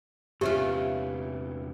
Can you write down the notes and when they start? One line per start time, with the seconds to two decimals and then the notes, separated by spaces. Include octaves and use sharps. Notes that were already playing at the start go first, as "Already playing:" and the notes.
0.41 E2 C3 E3 C#4 F4 G4